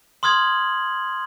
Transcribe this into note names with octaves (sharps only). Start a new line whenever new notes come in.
C6 D#6 F6 G#6 F#7